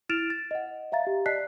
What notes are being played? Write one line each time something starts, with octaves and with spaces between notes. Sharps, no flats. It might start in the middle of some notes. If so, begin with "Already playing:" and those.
E4 F6 A6 D7 E7 F7
A6
D#5 F#5
E5 F5 A#5 A6
G4
D5 D#5 A5 F#6 B6 C7